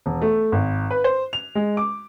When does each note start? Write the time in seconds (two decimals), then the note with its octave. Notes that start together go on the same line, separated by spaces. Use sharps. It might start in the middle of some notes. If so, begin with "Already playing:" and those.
0.06 E1
0.22 A3
0.52 G#1
0.91 B4
1.04 C5
1.33 F7
1.55 G#3
1.77 D6